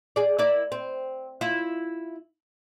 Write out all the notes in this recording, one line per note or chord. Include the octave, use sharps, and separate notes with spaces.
G#4 D5
E4 A#4 D5
C4
E4 F4